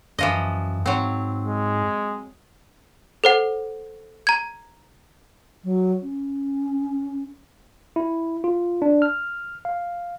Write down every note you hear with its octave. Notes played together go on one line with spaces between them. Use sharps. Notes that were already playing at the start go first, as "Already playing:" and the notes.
F#2 E3 F3 D#5
G#2 F#3 C4
G#3
A4 C5 F#5
A#5 G#6
F#3
C#4
E4
F4
D4
F6
F5